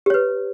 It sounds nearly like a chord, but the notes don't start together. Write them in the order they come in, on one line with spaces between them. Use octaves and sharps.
G4 C#5 B4